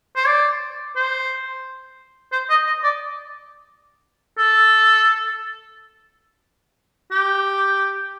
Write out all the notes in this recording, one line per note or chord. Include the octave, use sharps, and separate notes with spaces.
C5
D5
C5
C5
D#5
D#5
D5
A4
G4